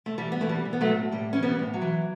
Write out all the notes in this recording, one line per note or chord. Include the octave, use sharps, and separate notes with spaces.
A3
E3 G3
B3
E3 A3
G3
E3
B3
F#3 A3
A2
A2 G3
E3 C#4
G3 B3
A2
F#3
E3